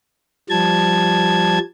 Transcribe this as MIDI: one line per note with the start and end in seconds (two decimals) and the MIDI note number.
0.50 1.58 53
0.50 1.58 55
0.50 1.58 81
0.50 1.58 92